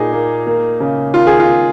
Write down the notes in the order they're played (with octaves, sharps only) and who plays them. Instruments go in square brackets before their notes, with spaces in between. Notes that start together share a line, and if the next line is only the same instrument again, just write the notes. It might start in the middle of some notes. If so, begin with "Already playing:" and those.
Already playing: [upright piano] A#2 D#4 G#4
A#3
A#3
C#3
D#3 F4
G#4
F4